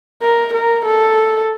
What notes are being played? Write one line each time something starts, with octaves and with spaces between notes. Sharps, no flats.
A#4
A#4
A4